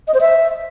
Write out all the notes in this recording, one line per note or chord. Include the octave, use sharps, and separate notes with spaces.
D#5
C5
E5